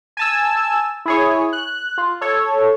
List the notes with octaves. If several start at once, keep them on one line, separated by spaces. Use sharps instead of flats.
G#5 A5 E6
E4 G#4 C#5
F#6
F4
A4 C#5